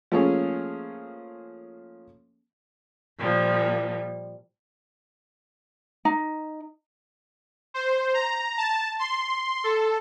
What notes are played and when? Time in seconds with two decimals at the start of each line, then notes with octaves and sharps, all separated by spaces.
0.12 F3 A3 A#3 C#4 G#4 C#5
3.18 A#2 F3 G3
6.05 D#4
7.74 C5
8.14 A#5
8.57 A5
8.99 C6
9.64 A4